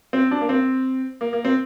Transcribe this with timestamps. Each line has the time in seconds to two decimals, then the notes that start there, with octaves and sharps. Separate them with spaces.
0.13 C4
0.31 D4
0.41 A#3
0.49 C4
1.21 A#3
1.33 A#3
1.45 C4